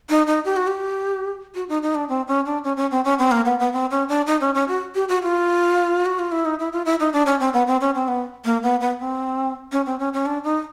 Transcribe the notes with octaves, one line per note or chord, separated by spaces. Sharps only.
D#4
D#4
G4
F#4
G4
F#4
D#4
D#4
D4
C4
C#4
D4
C#4
C#4
C4
C#4
C4
A#3
B3
B3
C4
C#4
D4
D#4
C#4
C#4
F#4
G4
F#4
F4
F#4
F4
E4
D#4
E4
F4
E4
D#4
D4
C#4
C4
B3
C4
C#4
C4
B3
A#3
B3
B3
C4
C#4
C4
C#4
C#4
D4
D#4